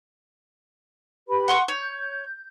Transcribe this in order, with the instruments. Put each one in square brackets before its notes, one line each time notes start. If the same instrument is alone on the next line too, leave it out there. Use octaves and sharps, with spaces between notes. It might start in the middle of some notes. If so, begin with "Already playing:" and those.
[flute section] G4 B4 B5
[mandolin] F#5 C6 C#6
[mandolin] C#5 [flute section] G6